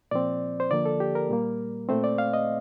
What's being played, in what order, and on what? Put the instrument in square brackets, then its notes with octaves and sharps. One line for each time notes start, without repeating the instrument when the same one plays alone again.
[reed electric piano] A#2 F3 C4 D5
C5
D3 F3 A#3 D5
A4
G4
A#4
A#2 G3 A#3
A#2 A3 C4 C5
D5
F5
D#5